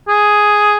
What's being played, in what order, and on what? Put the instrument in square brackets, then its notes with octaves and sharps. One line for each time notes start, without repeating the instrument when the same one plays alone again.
[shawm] G#4